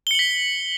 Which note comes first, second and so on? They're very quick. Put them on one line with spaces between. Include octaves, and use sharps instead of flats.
G7 C#7 F#7 B6